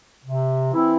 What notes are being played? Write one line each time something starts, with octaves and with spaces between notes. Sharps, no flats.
C3
E3 C4 E4